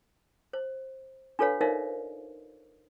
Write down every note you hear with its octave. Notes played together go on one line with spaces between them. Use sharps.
C5
D4 F4 A4 B4 C#5 F5
D#4 A#4 C5 D5 E5 F5